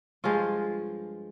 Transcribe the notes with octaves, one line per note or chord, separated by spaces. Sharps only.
G2 F3 G#3 F4